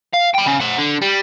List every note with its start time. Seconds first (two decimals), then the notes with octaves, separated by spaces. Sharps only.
0.14 F5
0.35 G5 B5
0.47 C#3
0.60 C5 F#5
0.78 D3
1.02 G3